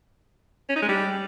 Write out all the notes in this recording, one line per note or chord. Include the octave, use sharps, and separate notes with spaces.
C#4
D#4
G#3
G3